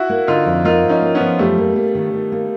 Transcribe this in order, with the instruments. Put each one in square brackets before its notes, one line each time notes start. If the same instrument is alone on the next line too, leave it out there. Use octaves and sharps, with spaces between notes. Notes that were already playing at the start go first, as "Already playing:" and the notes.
Already playing: [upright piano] E4 F#4
[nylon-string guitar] A#3
[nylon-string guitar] D3 [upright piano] D#4 F4
[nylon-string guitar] F2
[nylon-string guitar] A#3 [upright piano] D#4 F4
[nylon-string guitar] F3
[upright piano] C#4 D#4
[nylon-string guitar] A#3
[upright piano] B3 C#4
[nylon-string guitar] F3
[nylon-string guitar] F#2 [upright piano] G3 A3
[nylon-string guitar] A#3
A#3
D#3
D#3
A#3